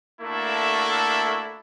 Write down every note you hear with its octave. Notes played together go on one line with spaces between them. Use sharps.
A3 A#3 D4 E4 F#4 A4